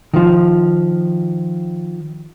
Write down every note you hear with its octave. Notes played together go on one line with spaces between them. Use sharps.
D#3 F3